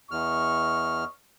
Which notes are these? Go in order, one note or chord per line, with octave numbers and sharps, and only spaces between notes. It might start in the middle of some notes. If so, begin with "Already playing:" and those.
E2 D#5 C#6 F6